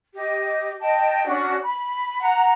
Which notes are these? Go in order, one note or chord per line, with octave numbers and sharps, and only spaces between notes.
G4 D#5
D#5 G5 A5
C#4 D4 F#4 D5
B5
F#5 A#5